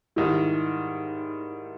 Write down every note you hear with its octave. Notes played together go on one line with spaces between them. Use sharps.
G#2 D#3 G3 E4